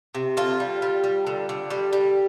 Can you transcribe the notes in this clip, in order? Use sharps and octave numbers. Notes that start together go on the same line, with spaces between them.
C3
D3 F4
G3
G3
G3
D3
D3
G3
G3